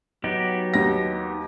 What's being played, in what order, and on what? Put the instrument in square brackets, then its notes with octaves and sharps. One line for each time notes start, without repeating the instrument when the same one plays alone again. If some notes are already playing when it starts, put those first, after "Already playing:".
[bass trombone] F#3 [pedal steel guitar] B3 D#4 G4
[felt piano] D#2 A#6